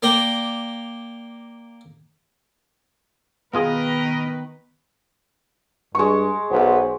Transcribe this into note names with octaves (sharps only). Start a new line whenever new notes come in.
A#3 D5 G5 A#5
B2 D#3 B3 F4 G#4 A#4 B4 D#5
G2 G#3 C#6
B1 B3 C5